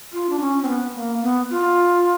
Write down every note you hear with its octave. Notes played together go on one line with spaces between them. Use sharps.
F4
D4
C#4
C4
B3
A#3
B3
F4